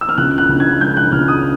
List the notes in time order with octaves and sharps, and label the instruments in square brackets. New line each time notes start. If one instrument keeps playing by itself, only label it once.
[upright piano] E6
F6
C#2 F#6
F#6
C#2
G#6
G#3 G6
F#6
C#2 F6
D#6